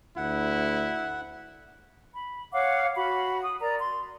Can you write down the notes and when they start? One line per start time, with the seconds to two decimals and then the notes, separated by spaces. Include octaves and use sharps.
0.17 D2 E4 F#5
2.14 B5
2.53 C#5 F5 F#5 D6
2.95 F#4 B5
3.43 D#6
3.60 A#4 D5 A#5
3.80 C6